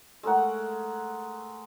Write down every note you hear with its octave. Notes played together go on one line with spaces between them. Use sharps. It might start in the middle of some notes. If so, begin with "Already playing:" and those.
G#3 A3 A#4 F#5